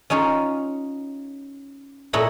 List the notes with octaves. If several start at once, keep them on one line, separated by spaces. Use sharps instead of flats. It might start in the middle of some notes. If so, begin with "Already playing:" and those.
C#4 D#4 F4 C#5
A#2 E4 A4 C#5 D#5 B5